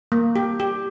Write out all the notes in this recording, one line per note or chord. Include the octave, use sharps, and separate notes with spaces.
A#3
G4
G4